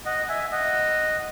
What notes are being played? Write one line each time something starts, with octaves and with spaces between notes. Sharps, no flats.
D#5 F#5
E5 G#5
D#5 F#5